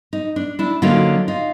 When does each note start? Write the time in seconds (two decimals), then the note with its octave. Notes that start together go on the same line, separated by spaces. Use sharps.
0.13 D#4
0.36 D4
0.59 D4 E4
0.82 D3 F#3 A#3 C#4 D#4 F4
1.28 D#4 F4